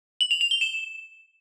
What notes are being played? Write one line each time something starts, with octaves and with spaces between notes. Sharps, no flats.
F#7
F7
F7
G7
E7